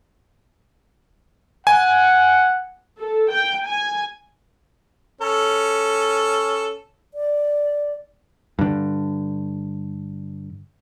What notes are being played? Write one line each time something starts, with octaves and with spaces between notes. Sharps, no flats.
F#5 G#5
A4
G5
G#5
C#4 A4
D5
G2 D3